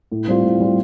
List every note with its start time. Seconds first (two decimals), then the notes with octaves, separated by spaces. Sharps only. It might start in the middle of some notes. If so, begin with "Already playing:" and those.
0.12 A2
0.28 G3 C4 F4
0.44 A2
0.60 G3 C4 F4